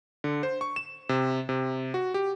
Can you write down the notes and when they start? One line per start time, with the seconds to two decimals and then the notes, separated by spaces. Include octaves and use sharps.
0.24 D3
0.43 C5
0.61 C#6
0.76 E7
1.09 C3
1.49 C3
1.94 F#4
2.14 G4